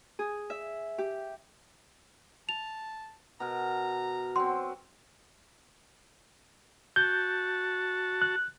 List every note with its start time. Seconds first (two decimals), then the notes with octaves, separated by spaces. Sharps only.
0.19 G#4
0.50 E5
0.98 G4
2.49 A5 F7
3.40 B2 A#4 A#5
4.36 F#3 C4 C6
6.96 F#4 A5 G6
8.22 F#6